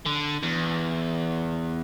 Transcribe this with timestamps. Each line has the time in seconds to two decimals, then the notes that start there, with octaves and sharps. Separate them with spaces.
0.06 D3
0.43 E2